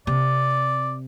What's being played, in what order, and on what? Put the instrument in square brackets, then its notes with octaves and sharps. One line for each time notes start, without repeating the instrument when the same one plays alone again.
[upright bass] C3 [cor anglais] D5